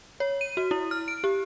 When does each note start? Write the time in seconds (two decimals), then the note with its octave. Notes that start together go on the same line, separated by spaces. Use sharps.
0.20 C#5
0.41 D#7
0.57 F#4
0.71 E4
0.91 F6
1.08 D7
1.24 G4